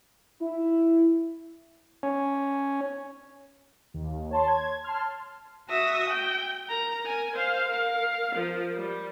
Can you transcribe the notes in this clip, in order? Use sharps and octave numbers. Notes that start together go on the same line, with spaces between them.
E4
C#4
D#2
C#5 A5 C6
G#6
A5 C6 F6
F#4 E5 D#6 A#6
G5
A#4 A#5
A#4 G#5
C5 F5
A#4 F5
F3 A#4
G3